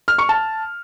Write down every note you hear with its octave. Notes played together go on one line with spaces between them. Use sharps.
F6
C#6
A5